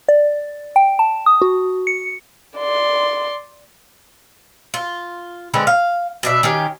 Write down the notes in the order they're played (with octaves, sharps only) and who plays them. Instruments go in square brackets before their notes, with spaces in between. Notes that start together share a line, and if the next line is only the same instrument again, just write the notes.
[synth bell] D5
G5
A5
D#6
F#4
C#7
[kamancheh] D5 C6
[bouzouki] F4
D3 G#3 B3 C4
F5
B2 D4 E5
D#3 C#4 G4